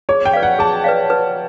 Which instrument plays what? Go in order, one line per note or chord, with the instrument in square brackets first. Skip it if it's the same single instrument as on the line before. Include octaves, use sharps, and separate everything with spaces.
[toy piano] G#4 [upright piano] C#5
[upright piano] G5
[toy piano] B4 D5 F5
[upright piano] F#5
[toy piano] G#4 [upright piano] A5
[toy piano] B4 D5 F5
B4